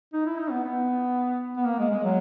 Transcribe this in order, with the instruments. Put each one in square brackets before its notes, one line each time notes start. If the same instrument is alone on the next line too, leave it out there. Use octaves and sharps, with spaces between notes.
[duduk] D#4
E4
D#4
B3
B3
B3
A#3
G#3
G#3
F#3